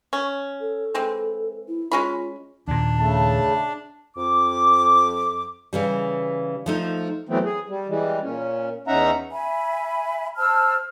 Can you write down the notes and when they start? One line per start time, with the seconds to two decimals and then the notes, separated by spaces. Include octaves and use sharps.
0.13 C#4
0.60 A4
0.94 E3 G#3 C4
1.68 E4
1.92 G#3 C#4 F4 B5
2.68 D#2 A#2 D4
2.99 C#3 A3 A5
4.17 F2 D6
5.73 C#3 E3 G3
6.66 F3 A3 D#4
7.29 E3 F#3 A3 B3 C4
7.44 G#4
7.69 G3
7.89 E3 G3 G#3
8.23 A#2 C#4
8.88 E2 C#4 D#4 E5 F#5 A#5
9.30 E5 G#5 B5
10.36 C5 A5 E6 F6